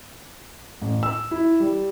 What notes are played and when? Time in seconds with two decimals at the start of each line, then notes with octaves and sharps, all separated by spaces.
0.81 A1
1.03 E6
1.31 E4
1.60 G3